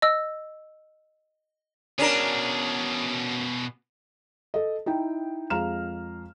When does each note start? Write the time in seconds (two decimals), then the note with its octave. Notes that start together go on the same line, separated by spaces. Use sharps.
0.02 D#5 E6
1.99 B2 C#4 D4 G#4 A#4
4.54 A4 D#5
4.86 D#4 E4 G5
5.50 F2 G#3 F5 A#5 F6 E7